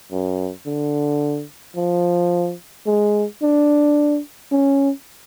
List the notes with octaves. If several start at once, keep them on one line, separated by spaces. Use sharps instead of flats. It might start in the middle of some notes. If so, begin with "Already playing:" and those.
F#2
D3
F3
G#3
D4
C#4